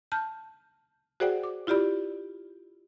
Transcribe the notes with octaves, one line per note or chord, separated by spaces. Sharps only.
A5 F6 G6
F#4 G#4 C5 D5 F#5 G5
D6
E4 F4 G4 D5 B5